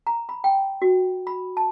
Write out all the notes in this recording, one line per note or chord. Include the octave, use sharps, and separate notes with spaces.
A#5
B5
G5
F#4
B5
A5